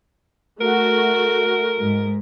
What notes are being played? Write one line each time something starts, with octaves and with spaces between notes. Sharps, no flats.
A3 F#4 A#4
G#2